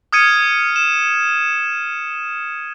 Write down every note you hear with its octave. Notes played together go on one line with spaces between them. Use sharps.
D#6 F6 G#6 C#7 D#7
E7